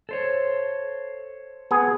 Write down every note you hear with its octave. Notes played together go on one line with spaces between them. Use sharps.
A4 C5 C#5
B3 G#4